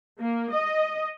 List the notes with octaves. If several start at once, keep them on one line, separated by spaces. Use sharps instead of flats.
A#3
D#5